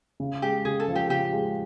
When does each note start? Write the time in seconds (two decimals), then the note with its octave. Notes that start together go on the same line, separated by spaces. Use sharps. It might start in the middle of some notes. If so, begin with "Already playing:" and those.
0.20 C#3
0.42 G#3 G4
0.65 C#3 G#4
0.80 A4
0.88 F3
0.95 G4
1.10 C#3 G4
1.33 G#3